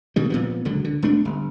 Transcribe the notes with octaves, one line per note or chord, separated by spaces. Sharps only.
B2 D#3 G3
A#2 F3 B3
C#2 D3 F#3
D3
E1 A3 D4
G1